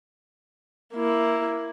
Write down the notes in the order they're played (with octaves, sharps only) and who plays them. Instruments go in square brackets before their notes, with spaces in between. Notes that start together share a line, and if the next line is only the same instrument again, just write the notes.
[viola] A#3 E4